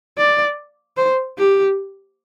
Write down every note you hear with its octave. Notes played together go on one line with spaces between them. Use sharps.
D5
C5
G4